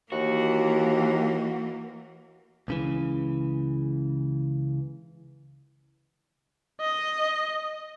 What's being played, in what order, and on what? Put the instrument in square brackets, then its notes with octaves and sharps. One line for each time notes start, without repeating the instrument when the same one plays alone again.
[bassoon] D#2 [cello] E3 A#3 [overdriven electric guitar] F#4
[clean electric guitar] C#2 C#3 E3
[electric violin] D#5